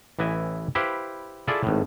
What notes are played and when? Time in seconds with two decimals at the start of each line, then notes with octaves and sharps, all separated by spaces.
0.19 A1 E3 E4 D#5 G#5
0.75 E4 G4 B4 C5 F5
1.48 E4 F4 G#4 A4 D5 E5
1.63 G#1 A2